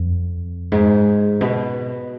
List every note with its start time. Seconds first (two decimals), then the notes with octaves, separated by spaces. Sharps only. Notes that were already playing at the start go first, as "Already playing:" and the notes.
Already playing: F2
0.72 G#2
1.41 B2